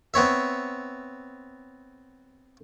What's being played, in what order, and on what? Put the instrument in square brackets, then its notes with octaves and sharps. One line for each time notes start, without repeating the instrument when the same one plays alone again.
[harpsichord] B3 C4 C#5 E5